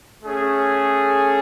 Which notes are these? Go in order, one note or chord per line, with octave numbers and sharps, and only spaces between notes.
A3 C#4 G#4